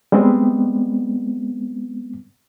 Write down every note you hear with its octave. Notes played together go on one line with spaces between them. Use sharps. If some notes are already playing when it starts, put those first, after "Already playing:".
G3 G#3 B3 C4